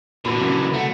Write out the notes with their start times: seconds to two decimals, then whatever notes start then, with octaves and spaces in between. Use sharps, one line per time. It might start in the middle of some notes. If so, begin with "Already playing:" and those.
0.25 A#2 D3 E3 F#4 B5
0.40 C#3 F#3 A#3
0.74 A3 F#4 F#5